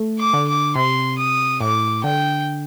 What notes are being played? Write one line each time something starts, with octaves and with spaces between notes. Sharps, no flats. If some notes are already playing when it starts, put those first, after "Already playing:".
Already playing: A3
D6
D3
D6
C3 C6
D#6
A2 D6
D3 G5